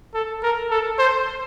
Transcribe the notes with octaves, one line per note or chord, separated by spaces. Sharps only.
A4
A#4
A4
C5